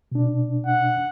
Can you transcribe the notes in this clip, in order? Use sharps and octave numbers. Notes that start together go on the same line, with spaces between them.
B2 D4
F#5